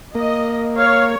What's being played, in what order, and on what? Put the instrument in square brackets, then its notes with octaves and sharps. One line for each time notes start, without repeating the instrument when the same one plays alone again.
[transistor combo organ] A#3 [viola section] D#5
[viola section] C#5 [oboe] F5